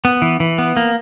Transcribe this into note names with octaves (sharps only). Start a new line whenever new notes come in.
B3
E3
E3
B3
A#3